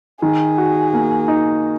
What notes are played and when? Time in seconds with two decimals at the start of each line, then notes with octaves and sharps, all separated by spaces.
0.21 D#3 G#4
0.58 F#4
0.94 A#3
1.28 D#4